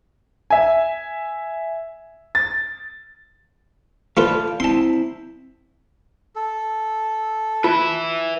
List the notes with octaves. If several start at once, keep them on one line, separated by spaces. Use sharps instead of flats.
E5 G#5
A6
A3 F4 A4 B4 D5 F5
C4 E4 A5 C6
A4
F4 B4 E5